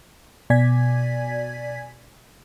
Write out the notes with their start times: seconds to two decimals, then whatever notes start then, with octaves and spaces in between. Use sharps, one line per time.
0.50 B2 D5 G#5 G#6 B6